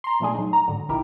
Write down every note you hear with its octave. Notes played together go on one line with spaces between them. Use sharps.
A#5 C6
A#2 F3 A3 D4 G#4
F#3 D#4
A#5
G#2 D3 F#3
A#1 D#4 E4 G4 A#4